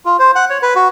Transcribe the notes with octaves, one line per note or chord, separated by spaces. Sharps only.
F4
C5
F#5
C#5
B4
F#4